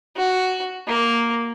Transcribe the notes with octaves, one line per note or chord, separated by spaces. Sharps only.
F#4
A#3